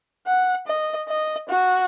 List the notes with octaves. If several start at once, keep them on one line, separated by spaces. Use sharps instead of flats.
F#5
D#5
D#5
F#4